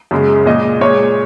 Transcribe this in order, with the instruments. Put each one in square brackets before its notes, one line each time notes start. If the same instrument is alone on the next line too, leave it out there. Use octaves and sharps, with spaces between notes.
[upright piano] F#2 C#3 G#3
A#2 G#3 D#5
A#2 G#3 C#5